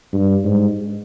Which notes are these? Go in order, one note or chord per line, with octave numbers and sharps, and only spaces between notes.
G2
G#2